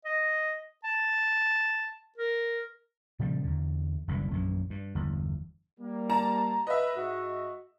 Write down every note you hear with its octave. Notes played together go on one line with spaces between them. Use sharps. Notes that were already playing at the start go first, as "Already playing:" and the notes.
D#5
A5
A#4
A#2 C#3 F3 G3
E2 D3
F#1 C2 D3 E3
A#1 F#2 E3
G2
G1 E2
G3 A#3
A5 A#5
B4 D#5 E5
G#2 F#4